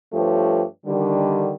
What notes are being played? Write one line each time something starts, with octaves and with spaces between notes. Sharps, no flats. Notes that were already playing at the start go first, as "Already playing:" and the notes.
G2 F3 A3 G4 B4 C#5
D3 D#3 G3